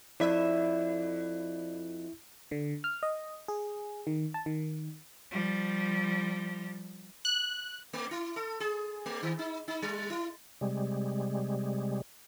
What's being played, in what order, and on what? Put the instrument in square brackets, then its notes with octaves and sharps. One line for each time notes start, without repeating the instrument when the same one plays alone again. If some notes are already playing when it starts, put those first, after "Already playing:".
[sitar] F2 E5 [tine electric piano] E4 [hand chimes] D5
[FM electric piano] D3
F6
D#5
G#4
D#3
A5
D#3
[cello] F3 G3
[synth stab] F#6
[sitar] A3
E4
A4
G#4
A3
D#3
D#4
D#4
G3
E4
[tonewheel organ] C3 G3 G#3